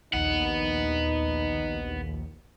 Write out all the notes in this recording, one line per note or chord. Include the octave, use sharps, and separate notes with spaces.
A#1 D#2 B3 D#4 F#5